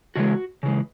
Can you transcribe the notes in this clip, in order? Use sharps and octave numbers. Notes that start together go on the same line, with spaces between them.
C#3 E3 G#3 F#4
C#3 E3 G#3